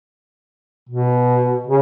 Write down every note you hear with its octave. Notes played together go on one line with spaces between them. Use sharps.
B2
C#3